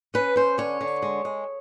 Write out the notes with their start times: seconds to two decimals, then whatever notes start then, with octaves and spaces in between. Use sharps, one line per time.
0.14 C#4 B4
0.36 C#4 C5
0.58 D3 C#5
0.81 D3
1.03 G#3
1.25 G#3